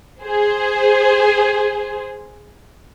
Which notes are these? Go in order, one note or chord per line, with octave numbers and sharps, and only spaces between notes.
G#4 C5